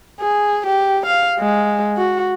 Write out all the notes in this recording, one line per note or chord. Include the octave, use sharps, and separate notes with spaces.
G#4
G4
F5
G#3
F#4